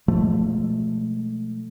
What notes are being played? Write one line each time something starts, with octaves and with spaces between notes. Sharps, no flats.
B2 F3 G#3 A3